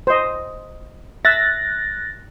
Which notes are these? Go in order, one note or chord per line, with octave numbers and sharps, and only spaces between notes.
C5 D#5
E5 F#6 A6 A#6